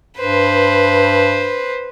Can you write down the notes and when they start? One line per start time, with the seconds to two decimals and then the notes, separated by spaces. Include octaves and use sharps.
0.18 G2 B4 C5